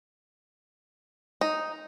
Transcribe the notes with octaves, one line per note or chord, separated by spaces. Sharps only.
D#4